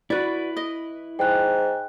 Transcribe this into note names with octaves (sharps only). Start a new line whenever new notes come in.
E4 F#4 B4 D5
D#5
G#2 G5 G#5 F#6